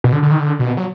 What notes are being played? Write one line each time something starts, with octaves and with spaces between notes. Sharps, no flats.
B2
D3
D3
D#3
D3
B2
F#3